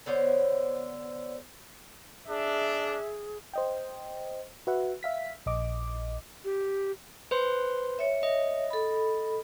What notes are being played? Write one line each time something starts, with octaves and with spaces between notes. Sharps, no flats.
D3 B3 C5 C#5
D4 G#4 E5
C5 D#5 G5
F#4 B4 E5 F#5
E5 F5 B6
A#1 D#5 D6
G4
B4 C5 C6
C#5 E5
D#5
A4 B5